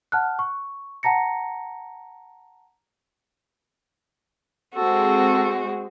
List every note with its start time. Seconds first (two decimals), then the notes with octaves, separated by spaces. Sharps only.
0.12 F#5 A5 F6 F#6
0.39 C#6
1.03 F#5 A5 A#5 A#6 C#7
4.75 G#3 C4 F#4 A4